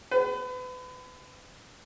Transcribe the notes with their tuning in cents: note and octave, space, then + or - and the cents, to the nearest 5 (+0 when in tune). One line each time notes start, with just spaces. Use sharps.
B4 +35